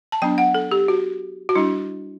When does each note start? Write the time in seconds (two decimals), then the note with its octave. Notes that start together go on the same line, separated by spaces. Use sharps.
0.12 A5
0.22 F#3 B3 D4 G5
0.38 F#5
0.54 A4
0.71 G4
0.88 F#4
1.49 F#4
1.55 G3 D4 E4